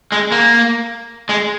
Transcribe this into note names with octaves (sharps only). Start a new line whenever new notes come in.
G#3
A#3
G#3